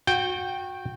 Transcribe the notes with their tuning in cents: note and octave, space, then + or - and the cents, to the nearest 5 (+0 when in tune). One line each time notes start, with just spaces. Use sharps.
F#4 -25 G5 +0